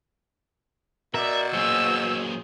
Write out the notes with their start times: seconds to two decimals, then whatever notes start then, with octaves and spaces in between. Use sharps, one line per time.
1.14 B2 A#4 D5 E5
1.54 A#2 F#3 G#4 C5 E6